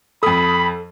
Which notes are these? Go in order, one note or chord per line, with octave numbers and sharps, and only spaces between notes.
F2 A4 B5 D#6